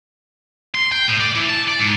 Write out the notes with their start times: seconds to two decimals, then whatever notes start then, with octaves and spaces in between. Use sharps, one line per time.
0.75 C6
0.92 G5
1.08 A2
1.20 D5
1.36 E3
1.50 A5
1.68 D5
1.79 G#2